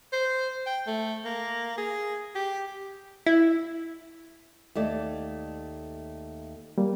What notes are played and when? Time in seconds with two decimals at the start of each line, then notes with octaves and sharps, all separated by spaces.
0.12 C5
0.66 G5
0.86 A3
1.25 A#3
1.77 G#4
2.35 G4
3.26 E4
4.75 D#2 A3 D5
6.78 G3 A#3